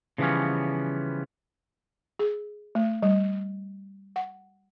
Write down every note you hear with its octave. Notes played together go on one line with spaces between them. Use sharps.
C#3 E3 F3 G3 B3 C#4
G#4
A3
G3
F#5